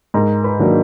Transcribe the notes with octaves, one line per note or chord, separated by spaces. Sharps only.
G#2 A#4 A#5
B4 B5
D#3 F#3 A#3 D4